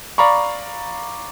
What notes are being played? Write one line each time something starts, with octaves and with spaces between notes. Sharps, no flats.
D5 F5 A#5 B5 C#6